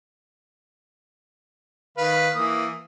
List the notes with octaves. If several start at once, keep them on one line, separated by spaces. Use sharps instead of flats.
D#3 B4 F5
E3 A#3 D#6